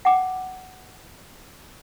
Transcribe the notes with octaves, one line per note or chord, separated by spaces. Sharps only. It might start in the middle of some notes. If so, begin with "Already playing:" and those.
F#5 G5 D6